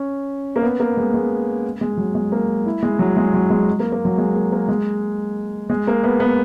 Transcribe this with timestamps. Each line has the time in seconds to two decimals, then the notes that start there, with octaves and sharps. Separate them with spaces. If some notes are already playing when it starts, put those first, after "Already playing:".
Already playing: C#4
0.56 A#3
0.62 B3
0.80 A#3
0.97 G#3
1.14 G#3
1.81 G#3
1.98 F#3
2.15 G#3
2.32 A#3
2.66 E4
2.83 G#3
2.99 F#3
3.17 G#3
3.34 F#3
3.50 G#3
3.79 A#3
3.92 A#3
4.05 F#3
4.18 G#3
4.35 A#3
4.52 A#3
4.69 G#3
5.70 G#3
5.87 A#3
6.03 B3
6.20 B3